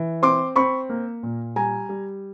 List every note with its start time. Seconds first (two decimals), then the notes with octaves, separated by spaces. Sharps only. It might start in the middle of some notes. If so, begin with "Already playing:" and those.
Already playing: E3
0.22 C4 C6 D6
0.56 C4 B5 C#6
0.89 A#3
1.23 A#2
1.56 G3 G#5 A#5
1.89 G3